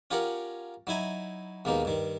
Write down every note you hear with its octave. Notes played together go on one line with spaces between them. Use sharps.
C#4 F4 G4 A#4 F#5
F#3 D#4 E4 G#5
D#2 B2 G#3 A#3 D#4
G2 D#3